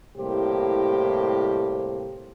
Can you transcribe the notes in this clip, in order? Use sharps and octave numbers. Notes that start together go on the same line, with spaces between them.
C2 A2 A#3 G4 C5